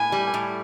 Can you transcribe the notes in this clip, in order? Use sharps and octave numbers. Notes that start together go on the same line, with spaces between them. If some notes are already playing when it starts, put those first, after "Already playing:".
Already playing: A2 G#5
G3
A2